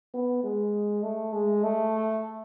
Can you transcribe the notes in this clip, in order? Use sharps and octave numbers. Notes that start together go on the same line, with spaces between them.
B3
G#3
A3
G#3
A3